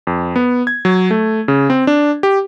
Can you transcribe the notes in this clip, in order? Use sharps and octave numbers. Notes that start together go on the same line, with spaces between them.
F2
B3
G#6
F#3
A3
C#3
C4
D4
G4